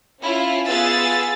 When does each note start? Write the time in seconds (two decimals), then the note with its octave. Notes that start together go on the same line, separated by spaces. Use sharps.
0.21 C#4 E4 F4
0.68 B3 F4 G#4 E6 A6